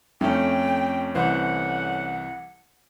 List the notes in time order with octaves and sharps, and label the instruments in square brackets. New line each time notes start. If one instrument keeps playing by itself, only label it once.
[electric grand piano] F2 [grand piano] A3 C#4 [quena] G5
[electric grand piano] C2 E3 C5 [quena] F#5